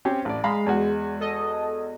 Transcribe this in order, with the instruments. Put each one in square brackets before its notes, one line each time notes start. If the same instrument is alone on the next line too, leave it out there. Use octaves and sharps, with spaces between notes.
[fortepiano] C4 C#4 G4
A1 D5
[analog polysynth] G#3 [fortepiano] F5 A#5 B5
[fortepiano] E2 F#4
[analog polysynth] A4 D#5